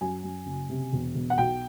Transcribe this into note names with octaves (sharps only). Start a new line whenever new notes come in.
F#2 G#5
F#2
F#1
C3
E1
E1
F#5
B1 G5